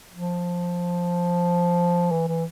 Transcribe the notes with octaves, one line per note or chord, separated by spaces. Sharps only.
F3
E3
E3